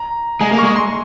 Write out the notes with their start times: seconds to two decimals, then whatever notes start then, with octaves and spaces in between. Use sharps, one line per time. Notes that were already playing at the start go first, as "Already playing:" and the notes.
Already playing: A#5
0.41 G#3 G#5
0.52 A#3
0.58 C#6
0.64 G#3
0.76 C6